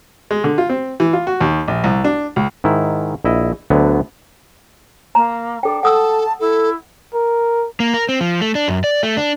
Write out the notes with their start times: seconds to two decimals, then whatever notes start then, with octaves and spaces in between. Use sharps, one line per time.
0.31 G#3
0.44 D3
0.58 F4
0.69 C4
1.00 E3
1.13 F4
1.27 F#4
1.41 D#2
1.68 A#1
1.84 C2
2.04 D4
2.36 C#2
2.64 G#2 D#3 E4
3.25 A#1 E4 D#5
3.70 D2 D3 F#3 B3
5.15 A#3 A#5
5.63 D4 A4 G5
5.83 A4 F#5 A5 D#6 E6
6.40 E4 A4
7.14 A#4
7.80 A#3
7.94 A#4
8.09 C4
8.21 F3
8.41 A3
8.55 D4
8.68 F#2
8.84 D5
9.03 A3
9.17 D4